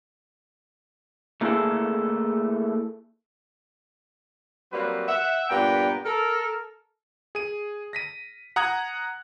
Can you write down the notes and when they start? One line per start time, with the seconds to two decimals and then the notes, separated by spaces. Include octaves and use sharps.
1.41 A3 A#3 E4 G#4 A4
4.72 F#3 G3 A#3 C4 F#4 B4
5.07 E5 F#5
5.49 G2 A#2 B3 B4 G5 A#5
6.05 A4 A#4
7.35 G#4 D#7
7.93 A#6 B6 D#7
8.56 F#5 A#5 D#6 F#6 G#6